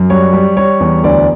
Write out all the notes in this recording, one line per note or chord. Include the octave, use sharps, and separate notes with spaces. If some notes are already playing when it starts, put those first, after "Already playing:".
Already playing: F#2
G3 C#5
G3
G3 C#5
E2
D2 D5